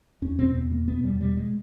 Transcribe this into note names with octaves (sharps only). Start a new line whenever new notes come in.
E2 C#4
B2 C4
E2 B3
B2 A#3
B2 B3
E2 G3
B2 G3
G#3